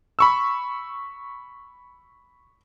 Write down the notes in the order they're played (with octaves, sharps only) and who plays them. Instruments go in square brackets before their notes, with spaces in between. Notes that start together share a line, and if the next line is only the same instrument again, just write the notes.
[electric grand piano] B5 C#6 E6